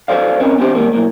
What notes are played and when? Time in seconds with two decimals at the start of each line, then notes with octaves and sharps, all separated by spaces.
0.08 F#4 G4 A4 C5 D5 F5
0.40 C4 C#4 D#4 A#4 B4
0.58 B3 C4 D4 G4 C5
0.75 D#3 G3 G#3 A#3
0.93 B1 A2 A#3